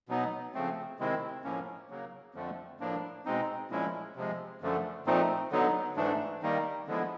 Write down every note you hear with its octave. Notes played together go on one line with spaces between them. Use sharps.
B2 F#3 B3 D#4
C#3 F3 A3 C4
C3 D#3 G#3 C4 E4
A2 F3 A#3 C#4
C#3 F#3 A#3
F2 D3 F3 A3
A2 F3 A#3 D4
B2 G#3 C4 D#4
A#2 F3 G#3 C#4 E4
C3 F3 G#3
F#2 D3 F3 A3
A#2 F3 A3 C4 D#4
D3 F#3 B3 D#4
G#2 E3 A3 D4
D#3 G3 A#3 D#4
D3 F3 G#3 B3 E4